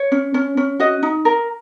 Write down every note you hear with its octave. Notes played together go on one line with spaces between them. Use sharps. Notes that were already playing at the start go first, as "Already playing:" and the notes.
Already playing: C#5
C#4
C#4
C#4
F#4 D#5
D#4
A#4